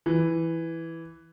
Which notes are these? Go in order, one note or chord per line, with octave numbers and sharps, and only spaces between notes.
E3